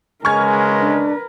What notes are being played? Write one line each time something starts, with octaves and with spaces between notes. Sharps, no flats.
C#3 G#3 A#4 B4 G#5 C#6 F6 G#6
D4